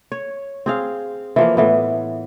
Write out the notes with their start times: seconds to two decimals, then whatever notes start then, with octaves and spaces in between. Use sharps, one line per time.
0.12 C#5
0.66 C4 G#4 F5
1.36 E3 F3 A#3
1.57 A2 E3 B3